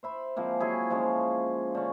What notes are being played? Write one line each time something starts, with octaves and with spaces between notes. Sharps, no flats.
C5 E5 B5
F3 G#3 A#3 C4
F#3 E4 G#4
F3 G#3 C#4
D3 C#4